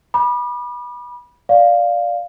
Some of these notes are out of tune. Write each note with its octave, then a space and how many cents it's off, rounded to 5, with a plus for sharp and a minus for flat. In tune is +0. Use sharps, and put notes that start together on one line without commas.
B5 -20 D6 +40
D5 +0 F5 +0